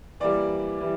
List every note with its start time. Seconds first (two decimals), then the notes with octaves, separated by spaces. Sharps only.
0.20 E3 G3 A#3 D5
0.81 E3 G3